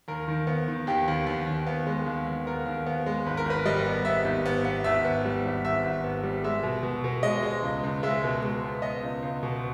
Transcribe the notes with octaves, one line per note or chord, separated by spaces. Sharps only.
D#2 A#4
D#3
B3
D#3
D#2 G4
D#2
D#2
D#2
B3
G#3
D#2
D#2
B3 A#4
D#2
B3
G#3
G#1 B4
A#4
G#1 B4
G3 D#5
B3
B3 E5
G#1
B3
B3
G#1 E5
B3
G3
G#1
G#1 E5
G#1
B3
G3
G#3 E5
B2
B2
B2
G#3 D#5
G#3
C#2
C#2
G#3 E5
B2
G#3
B3
B3 D#5
C#2
C#2
B2